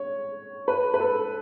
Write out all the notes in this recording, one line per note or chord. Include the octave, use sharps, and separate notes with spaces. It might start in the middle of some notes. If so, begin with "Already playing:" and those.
Already playing: C#5
B4
B4
A4